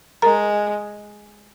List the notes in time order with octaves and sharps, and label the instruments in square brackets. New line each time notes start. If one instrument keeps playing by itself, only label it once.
[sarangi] G#3 [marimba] A#4 A#5